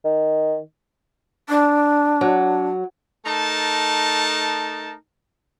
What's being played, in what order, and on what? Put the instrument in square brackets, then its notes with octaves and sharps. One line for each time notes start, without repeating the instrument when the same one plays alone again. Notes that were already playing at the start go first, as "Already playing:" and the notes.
[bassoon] D#3
[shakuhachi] D4
[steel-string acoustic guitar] F#3
[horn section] A3 D#4 A#4 A5